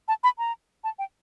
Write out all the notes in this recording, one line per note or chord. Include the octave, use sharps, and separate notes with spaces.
A5
B5
A#5
A5
G5